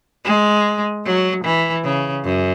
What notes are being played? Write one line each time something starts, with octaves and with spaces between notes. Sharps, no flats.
G#3
F#3
E3
C#3
F#2